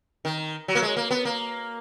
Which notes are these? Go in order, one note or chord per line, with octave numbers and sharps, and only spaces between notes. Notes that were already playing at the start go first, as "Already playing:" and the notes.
D#3
F#3
A#3
G#3
A#3
B3
A#3